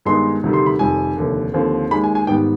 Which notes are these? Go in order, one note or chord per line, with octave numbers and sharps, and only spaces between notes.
G2 D#3 G#3 B3 D#4 C6
D2 C3 D#3 G3
C6
B5
F1 F2 D#3 G3 G#5
F1 D#2 D3
D#2 D3 F3 C4
D#2 D#3 G#3 B5
G#5
G#5
G#2 D#3 G3 B3 G5